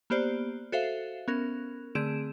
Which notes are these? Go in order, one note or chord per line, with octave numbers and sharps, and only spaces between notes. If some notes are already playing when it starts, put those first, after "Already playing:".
A#3 B3 G4 C5 D5
F#4 A4 C5 E5 F5
B3 C#4 A#4
D3 A3 C4 G#4 D7 E7